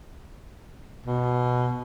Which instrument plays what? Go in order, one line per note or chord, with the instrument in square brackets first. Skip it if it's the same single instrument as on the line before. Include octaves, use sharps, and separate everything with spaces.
[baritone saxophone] B2